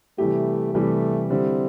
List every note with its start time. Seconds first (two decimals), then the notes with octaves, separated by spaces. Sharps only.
0.18 C3 E3 G3 A3 E4 G4
0.74 C3 E3 G3 A3 E4 G4
1.30 D3 G3 C4 E4